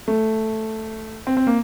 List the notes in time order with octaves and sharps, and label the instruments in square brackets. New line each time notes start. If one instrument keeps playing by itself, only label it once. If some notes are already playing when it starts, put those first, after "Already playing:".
[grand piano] A3
C4
C4
A#3